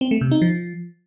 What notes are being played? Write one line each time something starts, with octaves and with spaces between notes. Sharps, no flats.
C4
A3
C3
D#4
F3